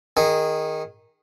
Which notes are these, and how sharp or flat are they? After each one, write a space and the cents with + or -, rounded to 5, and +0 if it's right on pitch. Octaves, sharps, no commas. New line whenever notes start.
D#3 +0 G#4 -15